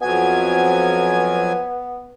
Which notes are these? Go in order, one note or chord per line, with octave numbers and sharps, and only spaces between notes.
F2 F#3 B3 G#5